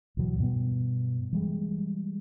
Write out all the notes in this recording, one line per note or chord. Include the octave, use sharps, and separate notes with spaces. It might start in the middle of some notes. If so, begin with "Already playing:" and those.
D2 B2 E3 F#3
G2 B2 G3 B3
E3 G3 G#3